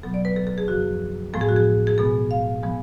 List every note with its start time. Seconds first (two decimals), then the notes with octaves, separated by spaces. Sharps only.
0.03 B2 F#3 B3 A4
0.14 D5
0.25 B4
0.36 A4
0.47 A4
0.58 G#4
0.68 F#2 C#3 F3 F#4
1.33 A2 F3 G#3 B3 A4
1.41 G#4
1.49 F#4
1.56 G#4
1.87 G#4
1.98 B2 G#3 B3 A4
2.31 F5
2.63 F3 G#3 B3